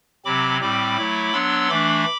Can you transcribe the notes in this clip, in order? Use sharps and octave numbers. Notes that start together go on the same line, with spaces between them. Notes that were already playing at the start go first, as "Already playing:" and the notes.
C3 F#3 C4 B5 D6
A2 G3 C4 B5 D6
F#3 A3 E4
F#3 B3 D4 C6 E6
E3 A3 D4 B5 D6